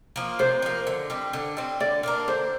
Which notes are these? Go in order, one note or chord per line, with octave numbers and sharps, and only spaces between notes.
F3 A#3
C3 C5
F3 A#3
D3
G3 C4
D3
G3 C4
D3 D5
A#3 D4 A#4
D3 C5